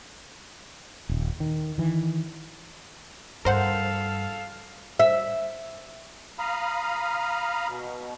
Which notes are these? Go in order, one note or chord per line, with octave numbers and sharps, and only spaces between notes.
D#1
D#3
D#3 E3
G2 A4 A#4 C5 F5 F#5
E5
F5 A#5 B5 D#6 F6
B2